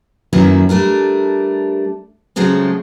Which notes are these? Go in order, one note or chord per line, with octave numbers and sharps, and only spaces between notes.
F#2 D#3 F#3 A#3 E4 B4
G3 A3 D4 A#4
C#3 F3 F#3 G#3 A3 C4